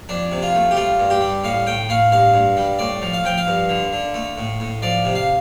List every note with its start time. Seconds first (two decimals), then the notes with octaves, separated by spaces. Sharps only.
0.09 F2 D4
0.32 C3
0.42 F4
0.55 A3
0.71 G4
0.76 G3 F4
1.00 G2
1.10 G4
1.21 G3
1.44 A2 F5
1.66 A2 G5
1.89 A2 F5
2.11 G2 F5
2.34 G2
2.57 G3
2.79 A2 D5
3.02 F3
3.14 F5
3.24 F3 G5
3.38 F5
3.47 G2
3.69 D3
3.93 D3
4.14 A3
4.38 A2
4.60 A2
4.82 F3 D5
5.05 C3
5.15 F5